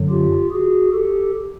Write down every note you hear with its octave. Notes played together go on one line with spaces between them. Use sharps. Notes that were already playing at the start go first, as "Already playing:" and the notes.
Already playing: F#2 D3 F#3
F4 G4
F#4 G#4
G4 A4